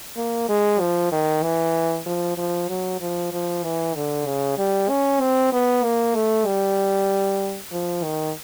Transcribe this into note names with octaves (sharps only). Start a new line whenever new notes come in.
A#3
G#3
F3
D#3
E3
F3
F3
F#3
F3
F3
E3
D3
C#3
G3
C#4
C4
B3
A#3
A3
G3
F3
D#3